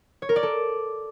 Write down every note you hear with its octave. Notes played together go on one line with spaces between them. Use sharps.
C#5
A#4
D5
A4